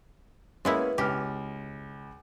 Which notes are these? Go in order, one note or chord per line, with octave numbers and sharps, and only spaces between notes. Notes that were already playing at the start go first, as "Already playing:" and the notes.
G#3 A#3 B3 C#4 E4
C#2 G4 F6